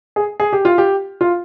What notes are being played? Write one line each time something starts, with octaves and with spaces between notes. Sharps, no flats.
G#4
G#4
G4
F4
G4
F4